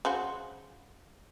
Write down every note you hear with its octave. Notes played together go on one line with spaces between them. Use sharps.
C#3 F#4 C5